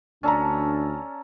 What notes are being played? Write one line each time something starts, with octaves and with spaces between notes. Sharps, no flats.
D2 C#4 D4 A4 D5 A5 A#5